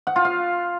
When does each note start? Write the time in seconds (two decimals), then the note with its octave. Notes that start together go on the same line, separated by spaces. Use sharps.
0.07 F#5
0.16 F4
0.25 F5